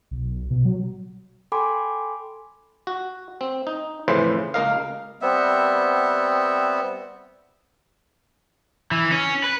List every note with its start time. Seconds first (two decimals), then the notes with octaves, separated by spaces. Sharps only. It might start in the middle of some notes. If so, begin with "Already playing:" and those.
0.11 B1
0.51 B2
0.65 F#3
1.52 A4 G5 G#5 B5 C6 D6
2.87 F#4
3.41 C4
3.67 D#4
4.08 F2 A2 C#3 E3 B4 C5
4.54 C#2 A#3 A#4 D#5 F5
5.21 G3 B3 C4 E5
8.91 E3
9.12 C#4
9.44 B4